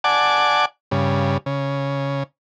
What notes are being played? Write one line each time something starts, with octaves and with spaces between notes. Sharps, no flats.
D5 F#5 G#5 A5 D6
G2 C#3
C#3